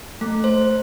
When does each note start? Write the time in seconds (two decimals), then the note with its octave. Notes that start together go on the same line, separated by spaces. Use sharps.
0.21 A3
0.44 C5